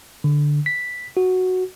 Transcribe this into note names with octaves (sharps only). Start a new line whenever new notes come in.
D3
B6
F#4